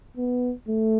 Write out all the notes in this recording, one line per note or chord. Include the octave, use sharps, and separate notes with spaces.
B3
A3